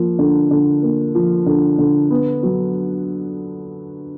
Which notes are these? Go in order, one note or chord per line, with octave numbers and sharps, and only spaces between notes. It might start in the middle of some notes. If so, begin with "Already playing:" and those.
Already playing: F3 A#3
D3
D3
A#3
F3
D3
D3
B3
F#3